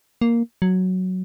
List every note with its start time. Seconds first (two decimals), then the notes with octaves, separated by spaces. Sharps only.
0.21 A#3
0.62 F#3